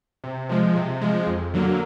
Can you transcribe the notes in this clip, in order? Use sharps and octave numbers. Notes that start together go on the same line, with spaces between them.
C3
F3 G#3
C3
F3 G#3
F2
D3 F#3 A#3